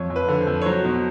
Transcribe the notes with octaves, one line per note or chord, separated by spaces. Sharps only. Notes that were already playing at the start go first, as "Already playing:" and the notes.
Already playing: F2 C#5
F2
B4
D3
C5
F2
C#5
F#3 C5
B2